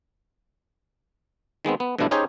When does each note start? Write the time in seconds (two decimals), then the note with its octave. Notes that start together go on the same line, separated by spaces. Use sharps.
1.65 D#3 G#3 B3 C4
1.80 B3
1.98 G2 B2 F3 A3 D4 E4
2.11 C#4 D#4 G4 G#4 C5 C#5